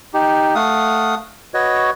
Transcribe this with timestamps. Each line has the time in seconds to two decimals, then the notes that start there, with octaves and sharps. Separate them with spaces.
0.14 D#4 G4
0.55 A3 F5 F#5 D#6
1.54 F#4 B4 C#5 D#5